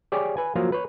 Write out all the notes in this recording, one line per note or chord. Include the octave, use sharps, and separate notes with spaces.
G4 G#4 C#5 D5
B4 G#5
F3 F#3 A#3 F4
B4 C#5